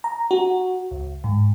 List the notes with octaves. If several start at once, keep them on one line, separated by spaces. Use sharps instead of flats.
A#5
F#4
C#2
G#2